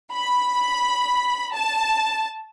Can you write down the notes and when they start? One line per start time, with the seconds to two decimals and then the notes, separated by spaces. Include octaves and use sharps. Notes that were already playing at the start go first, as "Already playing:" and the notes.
0.13 B5
1.54 A5